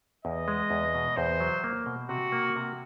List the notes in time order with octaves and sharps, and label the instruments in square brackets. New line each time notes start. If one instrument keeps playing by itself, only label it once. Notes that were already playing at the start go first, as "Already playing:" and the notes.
[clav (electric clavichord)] E2 [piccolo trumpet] D#5
[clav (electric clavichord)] G#3
E2
B2
[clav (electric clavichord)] E2 [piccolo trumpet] C5
[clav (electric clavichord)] F#3
A#3
B2
[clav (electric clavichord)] C3 [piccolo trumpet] F#4
[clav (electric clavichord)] A#3
C3